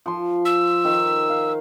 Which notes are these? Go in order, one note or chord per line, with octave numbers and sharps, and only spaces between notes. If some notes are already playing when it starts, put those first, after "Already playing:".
F3 C6
E6
D#3
F5